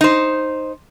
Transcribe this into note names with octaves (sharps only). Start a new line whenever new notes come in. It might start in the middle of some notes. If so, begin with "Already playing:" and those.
D#4 C5